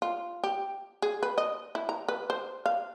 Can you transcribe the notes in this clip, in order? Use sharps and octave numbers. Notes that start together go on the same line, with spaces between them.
F4
G4
G#4
B4
D#5
E4
A#5
B4
C5
F5